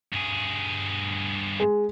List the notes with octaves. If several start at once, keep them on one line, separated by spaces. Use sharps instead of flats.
G2 G#4
G#3